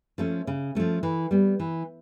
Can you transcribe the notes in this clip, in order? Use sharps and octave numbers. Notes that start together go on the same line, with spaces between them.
F3 A3 C#4
C#3
F3 A3 C#4
E3
G3 B3
E3